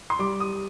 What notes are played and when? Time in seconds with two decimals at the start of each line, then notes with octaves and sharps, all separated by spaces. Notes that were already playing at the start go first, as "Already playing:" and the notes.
0.10 C6
0.19 G3 D6
0.40 D#6